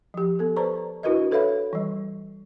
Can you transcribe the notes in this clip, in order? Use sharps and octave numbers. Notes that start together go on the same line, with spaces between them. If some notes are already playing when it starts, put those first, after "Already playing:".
F3 G4
B3 A4
B4 C5 D5 A5 A#5 C#6
D4 E4 F#4 A#4 B4 D#5
A4 B4 C#5 E5 F5 B5
E3 G3